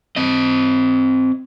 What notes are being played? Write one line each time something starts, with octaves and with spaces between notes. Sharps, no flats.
C4 D#5